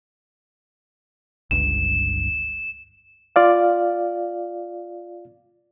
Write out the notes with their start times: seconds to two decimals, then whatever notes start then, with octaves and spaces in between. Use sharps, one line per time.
1.51 G1 C#2 G2 E7
3.36 F4 D5 F5